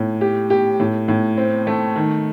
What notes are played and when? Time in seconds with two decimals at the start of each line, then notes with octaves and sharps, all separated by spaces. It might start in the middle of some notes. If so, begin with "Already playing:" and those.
Already playing: A2
0.21 G4
0.50 G4
0.80 A2
1.08 A2
1.37 C4
1.67 A3
1.96 D#3